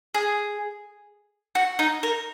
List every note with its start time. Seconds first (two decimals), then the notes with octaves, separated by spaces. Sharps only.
0.14 G#4
1.55 F#4
1.79 D#4
2.03 A#4